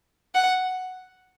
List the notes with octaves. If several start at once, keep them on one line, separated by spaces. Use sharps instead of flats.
F#5